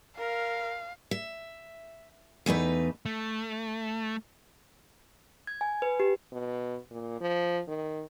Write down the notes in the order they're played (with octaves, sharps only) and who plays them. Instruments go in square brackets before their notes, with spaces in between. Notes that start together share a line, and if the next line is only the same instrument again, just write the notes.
[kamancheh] A#4 [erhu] F5
[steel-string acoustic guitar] E5
E2 A3 D#4 B4
[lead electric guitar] A3
[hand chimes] G#6
G#5
B4
G4
[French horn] B2
A#2
F3
D#3